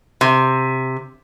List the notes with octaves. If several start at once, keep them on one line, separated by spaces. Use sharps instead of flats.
C3